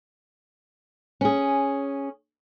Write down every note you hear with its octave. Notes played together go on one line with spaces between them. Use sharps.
C#4 G#4